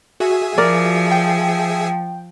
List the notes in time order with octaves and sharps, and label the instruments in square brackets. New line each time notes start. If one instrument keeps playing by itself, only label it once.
[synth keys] F#4 [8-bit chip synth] G#4 E5 G#5
[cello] F3 [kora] A#4 D5
[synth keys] G5